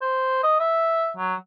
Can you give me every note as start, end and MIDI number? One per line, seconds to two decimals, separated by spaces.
0.01 0.41 72
0.43 0.57 75
0.60 1.11 76
1.17 1.35 54